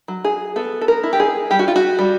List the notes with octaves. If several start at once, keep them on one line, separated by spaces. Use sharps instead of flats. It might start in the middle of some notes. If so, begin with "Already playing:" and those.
F#3
G#4
B3 A4
A4
A#4
E4
G4
G#4
G3 G4
F#4
F4
F#4
G3